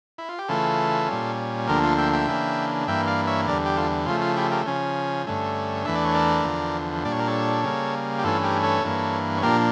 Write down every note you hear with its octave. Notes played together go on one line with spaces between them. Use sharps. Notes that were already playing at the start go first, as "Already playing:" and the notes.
E4
F4
G4
C#3 E3 A3 F4 A4
A#2 G3 C#4
D2 D3 F3 A#3 G4 A#4
F4 A4
E5 G5
E5 G5
C#3 E3 A#3 D4
G2 E3 A#3 E5 G5
D5 F5
C#5 E5
E2 D3 G3 A#4 D5
G4
F4 A4
C#3 F3 A3 F4
F4
E4 G4
G4 A#4
C#3 F3 C#4
G2 D3 A3 C#4
E2 E3 A3 D4 E5
D5
C#5
A#4 D5
E2 D3 F3
A#2 G3 D4 D5
C#5
A#4
A4 C#5
C#3 G3 A#3
G4
G2 E3 A3 C#4 F4 A4
G4 A#4
A4 C#5
G2 E3 A#3
C#5
A#2 F3 A#3 D4 G4 A#4